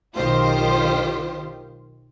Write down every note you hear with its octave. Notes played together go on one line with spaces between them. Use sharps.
B1 D#3 F4 G4 C5